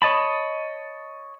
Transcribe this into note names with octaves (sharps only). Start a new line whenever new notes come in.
C#5 D#5 A5 B5